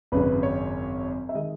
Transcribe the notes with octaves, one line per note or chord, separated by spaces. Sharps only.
G#1 F#2 C#3 B4
C#5
E5
D#3 G#3 D#5